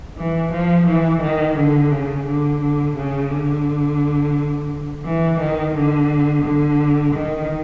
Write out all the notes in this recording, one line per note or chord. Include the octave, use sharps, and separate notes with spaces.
E3
F3
E3
D#3
D3
C#3
D3
D3
C#3
D3
E3
D#3
D3
D3
D#3